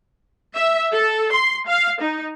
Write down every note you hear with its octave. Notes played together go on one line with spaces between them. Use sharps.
E5
A4
C6
F5
D#4